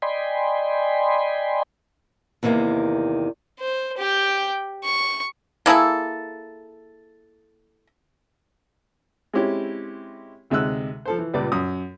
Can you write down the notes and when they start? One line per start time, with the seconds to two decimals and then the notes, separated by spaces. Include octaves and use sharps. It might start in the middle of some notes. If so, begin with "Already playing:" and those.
0.02 D5 D#5 G5 G#5 B5 C6
2.43 E2 C3 D#3 G#3 A#3
3.60 C5
3.98 G4 G5
4.84 C#6
5.66 A#3 E4 G#4 A4
9.33 G#3 C4 C#4 E4 G4 C#5
10.50 D2 C3 G#3 D#4 E6 F#6
11.05 F3 A4 C5
11.18 E3
11.34 C#2 A#2 G3 B4 D5
11.52 F#2 D#6